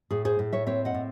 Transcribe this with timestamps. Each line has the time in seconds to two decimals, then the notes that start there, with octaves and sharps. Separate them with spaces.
0.11 A2 G#4
0.25 G#4 C5
0.39 A2
0.53 C#5 E5
0.67 C4 C#5 E5
0.85 D#5 F#5
0.94 A2